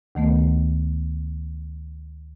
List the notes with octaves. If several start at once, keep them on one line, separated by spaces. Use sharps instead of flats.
D2 D#3 A3 B3